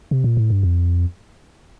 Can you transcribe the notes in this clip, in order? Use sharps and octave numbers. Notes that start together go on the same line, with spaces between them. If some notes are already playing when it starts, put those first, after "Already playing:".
C3
A#2
A2
G2
F2